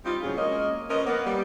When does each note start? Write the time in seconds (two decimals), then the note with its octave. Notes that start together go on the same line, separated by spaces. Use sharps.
0.05 G3 C4 D#4 F4
0.22 A2 C3 F3 F#3 C#4 G#4
0.37 G#3 A#3 C#4 A#4 D#5
0.90 F3 C#4 A#4 B4 C#5 D#5
1.05 A#3 B3
1.26 G3